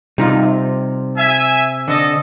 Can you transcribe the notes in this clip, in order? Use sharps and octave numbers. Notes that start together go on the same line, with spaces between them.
C3 G3 D#4 F4
E5 G#5
D3 A4 D#5